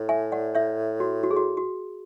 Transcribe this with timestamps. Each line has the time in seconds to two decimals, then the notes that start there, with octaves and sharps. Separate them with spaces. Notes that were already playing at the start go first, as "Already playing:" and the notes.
Already playing: A2
0.09 E5 G#5
0.32 D5 F#5
0.55 C#5 E5
1.00 F#4
1.23 F#4
1.31 G#4
1.37 F#4
1.57 F#4